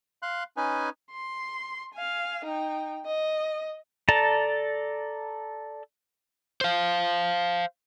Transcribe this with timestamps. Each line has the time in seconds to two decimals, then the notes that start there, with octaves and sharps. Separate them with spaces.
0.23 F5 C6 F#6
0.57 C#4 D#4 B4 G#5
1.11 C6
1.93 F5 G#5
2.45 D#4 G5
3.06 D#5
4.09 A4 D5 A5 A#5
6.61 C5 F5